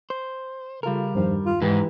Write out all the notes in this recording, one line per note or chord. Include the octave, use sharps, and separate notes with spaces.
C5
C#3 G3 F4 A4 A#4
E2 G2 D#3 F3
F4
G#2 E3 E4 G4